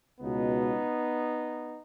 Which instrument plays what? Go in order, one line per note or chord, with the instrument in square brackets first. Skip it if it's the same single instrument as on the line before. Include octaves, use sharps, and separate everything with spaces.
[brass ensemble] C#2 B2 B3 D#4